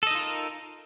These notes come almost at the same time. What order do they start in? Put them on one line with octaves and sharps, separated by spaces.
A4 D#5 D#4 F4 A#4